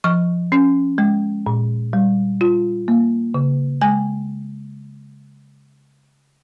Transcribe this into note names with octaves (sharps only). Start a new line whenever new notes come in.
F3 C#6
C#4
G#3
A#2
G3
F4
A#3
C#3
G#3 G#5